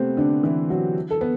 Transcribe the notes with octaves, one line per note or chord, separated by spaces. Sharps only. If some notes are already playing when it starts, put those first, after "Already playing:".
Already playing: C3 A3 B3 C4
D3 D4
E3 E4
F#3 F#4
A4
B3